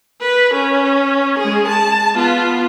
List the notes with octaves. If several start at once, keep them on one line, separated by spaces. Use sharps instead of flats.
B4
C#4
G#3 G#4
A5
B3 F4